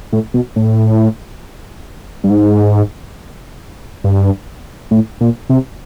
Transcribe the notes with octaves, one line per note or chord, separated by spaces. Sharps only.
A2
B2
A2
G2
G#2
G2
A2
A#2
C3